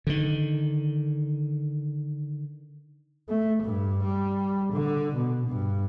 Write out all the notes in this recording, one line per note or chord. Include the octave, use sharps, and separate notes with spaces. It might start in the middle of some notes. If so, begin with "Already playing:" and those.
D3 D#3
A3
G2
G3
D3
B2
G2